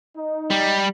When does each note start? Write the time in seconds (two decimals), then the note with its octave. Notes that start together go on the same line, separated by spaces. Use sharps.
0.17 D#4
0.51 G3